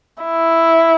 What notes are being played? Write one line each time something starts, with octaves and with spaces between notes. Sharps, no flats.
E4